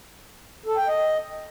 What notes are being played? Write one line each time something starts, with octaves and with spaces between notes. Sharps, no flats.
A4
G5
D#5